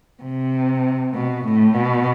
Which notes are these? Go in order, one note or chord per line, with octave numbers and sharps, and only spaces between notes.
C3
B2
A2
B2